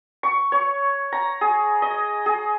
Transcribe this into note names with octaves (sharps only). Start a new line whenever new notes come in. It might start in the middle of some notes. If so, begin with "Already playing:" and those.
C#6
C#5
A#5
G#4
D#5
G#4